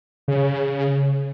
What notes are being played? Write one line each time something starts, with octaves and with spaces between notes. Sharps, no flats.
C#3